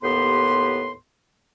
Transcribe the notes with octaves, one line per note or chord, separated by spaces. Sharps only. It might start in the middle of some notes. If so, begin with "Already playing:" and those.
D#2 A2 B3 G4 B4 C6